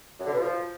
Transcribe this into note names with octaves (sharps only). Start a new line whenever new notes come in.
F#2
D3
B2
F3